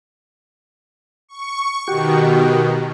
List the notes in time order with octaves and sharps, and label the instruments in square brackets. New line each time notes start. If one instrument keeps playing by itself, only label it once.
[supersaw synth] C#6
[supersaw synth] B2 D#3 [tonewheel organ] F#4 G4